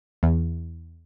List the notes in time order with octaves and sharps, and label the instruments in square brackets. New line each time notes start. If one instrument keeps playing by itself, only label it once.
[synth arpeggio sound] E2